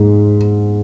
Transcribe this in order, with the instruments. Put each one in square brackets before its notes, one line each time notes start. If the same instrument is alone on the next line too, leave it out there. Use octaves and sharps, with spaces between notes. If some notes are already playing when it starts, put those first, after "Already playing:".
Already playing: [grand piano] G#2